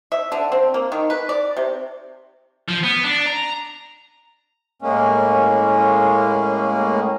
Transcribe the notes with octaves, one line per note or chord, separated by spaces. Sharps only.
E5
D3
C4
A#3
D#3
B4
D5
C3
F3
B3
D4
A#5
A2 G#3 A#3 C#4